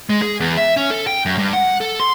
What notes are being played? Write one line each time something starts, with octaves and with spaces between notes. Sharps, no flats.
G#3
G#4
E2
E5
C#4
A4
G5
F#2
G2
F#5
A4
C6